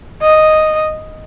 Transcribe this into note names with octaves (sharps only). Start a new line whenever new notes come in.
D#5